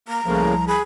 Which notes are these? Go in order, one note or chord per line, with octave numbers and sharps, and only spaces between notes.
A#3 A#5
C2 A2 C#3 F3 A#3
G#4 B5